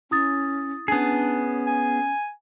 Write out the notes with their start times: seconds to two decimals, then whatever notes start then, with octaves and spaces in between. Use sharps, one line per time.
0.11 C#4 E4 D#6 A6
0.88 B3 C#4 D4 G#4
1.67 G#5